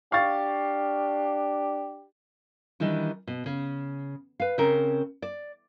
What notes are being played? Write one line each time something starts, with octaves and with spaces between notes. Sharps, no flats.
D4 G4 F5 C#6 A6
D#3 E3 G3 D4
B2
C#3
B4 F5
C#3 C4 C#4 A#4
D5